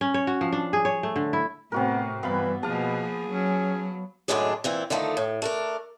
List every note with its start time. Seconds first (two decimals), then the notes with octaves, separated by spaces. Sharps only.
0.01 C#4
0.14 C#5
0.27 F#4
0.41 F3
0.52 D4
0.73 G#4
0.85 C#5
1.03 A3
1.16 D3
1.33 E4
1.72 A2 C3 B3 C4 F#4 A#4
2.23 G2 E3 B3 F5 B5
2.63 B2 F3 A#3 G#4 F5 A5
3.30 F#3 C#4
4.28 F#2 A2 D#3 G#3 D4 G#4
4.64 A#2 E3 C4
4.90 D3 D#3 F3 A3 D#4
5.17 A2
5.42 A3 D4 A#4